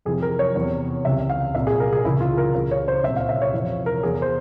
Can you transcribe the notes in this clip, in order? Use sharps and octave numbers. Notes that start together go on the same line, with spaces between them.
F2 C3 E3 G#4
A#4
C#5
E2 C3 E3
C#2 C3 E3 E5
F5
C2 A#2 E5
G#4
A#4
G#4
C#2 C#3 E3 E4
F4
A#4
C#2 C#3 E3
C#5
C5
C2 A#2 E5
F5
E5
C#5
F2 C3 E3
A#4
E2 E3 G#4
C5